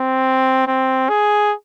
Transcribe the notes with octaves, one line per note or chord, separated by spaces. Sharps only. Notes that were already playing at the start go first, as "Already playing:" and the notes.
Already playing: C4
C4
G#4